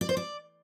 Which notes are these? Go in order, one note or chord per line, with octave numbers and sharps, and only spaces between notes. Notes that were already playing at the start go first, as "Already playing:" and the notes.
D5
C5
D5